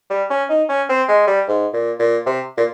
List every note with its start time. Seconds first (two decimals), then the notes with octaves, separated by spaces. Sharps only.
0.10 G3
0.30 C#4
0.49 D#4
0.69 C#4
0.89 C4
1.09 G#3
1.27 G3
1.48 G#2
1.74 A#2
1.99 A#2
2.26 C3
2.57 A#2